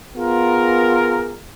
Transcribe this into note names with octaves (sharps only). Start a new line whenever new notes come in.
B3 F4 G#4 A#4